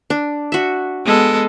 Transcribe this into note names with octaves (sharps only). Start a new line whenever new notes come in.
D4
F#4 E5
G#3 B3 A4